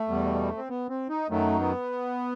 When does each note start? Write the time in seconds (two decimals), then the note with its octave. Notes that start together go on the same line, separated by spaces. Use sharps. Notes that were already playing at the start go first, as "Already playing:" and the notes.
Already playing: A3
0.08 E2 B2 G3
0.57 C4
0.69 B3
0.89 C4
1.09 D#4
1.29 F#2 D#3 F#3 A3
1.60 B3